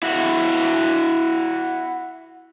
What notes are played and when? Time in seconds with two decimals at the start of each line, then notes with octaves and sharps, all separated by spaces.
0.03 E4 F#4